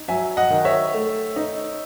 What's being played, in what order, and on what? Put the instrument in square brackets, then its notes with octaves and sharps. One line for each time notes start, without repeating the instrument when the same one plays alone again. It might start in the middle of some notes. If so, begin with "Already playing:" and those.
Already playing: [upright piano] D#4
F#3 E5 G#5
D#5 F#5
D#3
C#5 E5
A3
D#4